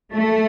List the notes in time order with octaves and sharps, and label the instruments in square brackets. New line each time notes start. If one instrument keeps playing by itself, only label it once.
[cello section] A3